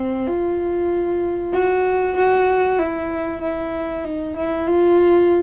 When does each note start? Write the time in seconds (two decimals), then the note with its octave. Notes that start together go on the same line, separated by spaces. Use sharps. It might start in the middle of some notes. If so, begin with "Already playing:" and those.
Already playing: C4
0.28 F4
1.53 F#4
2.16 F#4
2.78 E4
3.41 E4
4.05 D#4
4.36 E4
4.67 F4